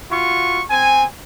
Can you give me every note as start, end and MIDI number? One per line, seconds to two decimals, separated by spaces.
0.10 0.61 65
0.10 0.61 66
0.10 0.61 85
0.70 1.05 60
0.70 1.05 80